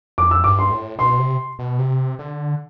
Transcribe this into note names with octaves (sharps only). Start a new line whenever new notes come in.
F2 D6
E6
G2 D6
C6
A2
B2 C6
C3
B2
C3
D3